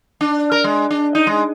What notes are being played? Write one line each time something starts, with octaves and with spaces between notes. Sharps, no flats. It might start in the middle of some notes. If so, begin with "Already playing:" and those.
D4
A#4
G#3
D4
D#4
G#3